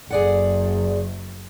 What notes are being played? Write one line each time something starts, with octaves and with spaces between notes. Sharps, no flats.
F#1 G#4 D5 F#5